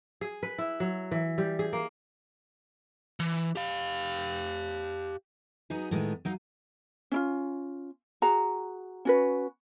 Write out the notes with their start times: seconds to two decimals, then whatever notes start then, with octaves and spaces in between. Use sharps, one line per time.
0.21 G#4
0.43 B4
0.58 E4
0.80 F#3
1.11 E3
1.38 G3
1.59 G#4
1.73 A#3
3.20 E3
3.55 G4 F5
5.70 F#3 B3 D#4 G#4
5.91 A2 D#3 G#3 B3
6.25 F#3 D#4 F5
7.12 C#4 E4 F4
8.22 F#4 G#4 A#5
9.05 C#4 F#4 B4